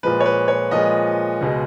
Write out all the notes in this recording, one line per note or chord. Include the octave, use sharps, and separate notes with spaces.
A#2 F3 G#3 B4
C#5
B4
C#5
A#2 F3 G#3 D#5
C#2 B2 G#3